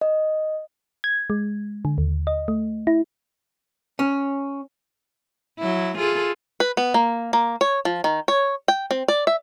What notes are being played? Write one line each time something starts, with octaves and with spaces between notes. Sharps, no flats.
D#5
G#6
G#3
D3
D#2
D#5
A3
E4
C#4
F#3 E4
F4 G#4 A4
B4
B3
A#3
A#3
C#5
F3
D#3
C#5
G5
C4
D5
E5